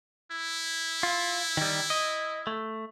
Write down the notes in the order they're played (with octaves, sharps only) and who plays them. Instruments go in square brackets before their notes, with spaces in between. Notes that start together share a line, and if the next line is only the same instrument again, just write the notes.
[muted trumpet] E4
[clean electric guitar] F4
D#3 G3
D#5
A3